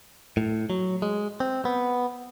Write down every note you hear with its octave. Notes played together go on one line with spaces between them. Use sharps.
A2
F#3
G#3
C4
B3